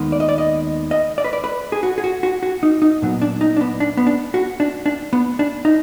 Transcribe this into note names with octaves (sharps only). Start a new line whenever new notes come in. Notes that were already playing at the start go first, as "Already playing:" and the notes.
Already playing: D#2 D#3 G#3 B3
D5
D#5
D5
D#5
D#5
D5
B4
D5
B4
G#4
F#4
G#4
F#4
F#4
F#4
D#4
D#4
A#2 F#3 B3
D4
D#4
D4
B3
D4
B3
D4
F#4
D4
D4
B3
D4
D#4